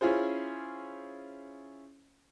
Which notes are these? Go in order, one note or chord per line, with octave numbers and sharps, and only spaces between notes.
C#4 E4 F4 G#4 C5